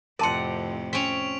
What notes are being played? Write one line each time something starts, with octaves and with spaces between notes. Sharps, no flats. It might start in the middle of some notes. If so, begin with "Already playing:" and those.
F2 A2 C3 A#4 D5 F#5 A5 C6
C4 C#4 B6 D7 F7